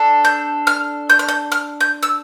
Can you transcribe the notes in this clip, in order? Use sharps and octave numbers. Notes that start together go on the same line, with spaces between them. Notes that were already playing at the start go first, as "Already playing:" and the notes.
Already playing: D4 A4
G6
F6
G6
F6
G6
F6
G6
E6